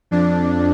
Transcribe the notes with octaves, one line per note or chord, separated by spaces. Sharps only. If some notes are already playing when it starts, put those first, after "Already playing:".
F2 D4